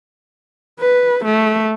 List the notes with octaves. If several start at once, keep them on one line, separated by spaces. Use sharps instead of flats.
B4
A3